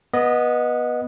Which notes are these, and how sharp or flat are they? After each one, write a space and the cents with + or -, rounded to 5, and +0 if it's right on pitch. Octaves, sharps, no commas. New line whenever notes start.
B3 -15 D#5 +0